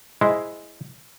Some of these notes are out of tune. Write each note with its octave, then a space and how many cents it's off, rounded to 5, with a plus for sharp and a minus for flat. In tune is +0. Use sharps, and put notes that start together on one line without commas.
G#3 +0 E4 +0 C5 +0